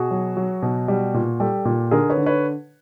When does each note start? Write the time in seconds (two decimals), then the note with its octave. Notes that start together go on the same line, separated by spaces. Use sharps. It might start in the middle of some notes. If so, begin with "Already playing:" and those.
Already playing: B2 F#4 G#4
0.11 F#3
0.37 F#3
0.63 B2
0.88 G3
1.14 A#2
1.40 G3 G4 A4
1.65 A#2
1.91 D3 G#4 A#4
2.10 B4 C#5
2.17 D3
2.26 B4 C#5